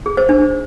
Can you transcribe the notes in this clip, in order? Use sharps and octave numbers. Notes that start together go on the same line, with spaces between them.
G#4
C5
D4